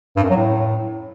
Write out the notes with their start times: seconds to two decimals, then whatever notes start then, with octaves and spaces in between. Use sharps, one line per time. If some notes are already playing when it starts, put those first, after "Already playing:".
0.16 G2
0.23 F#2
0.29 F#3
0.36 A2